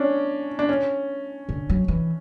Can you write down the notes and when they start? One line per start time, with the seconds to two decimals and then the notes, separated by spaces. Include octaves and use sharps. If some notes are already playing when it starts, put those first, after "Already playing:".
Already playing: C#4 D4
0.59 D4
0.69 C#4
1.49 D3
1.69 F#3
1.88 E3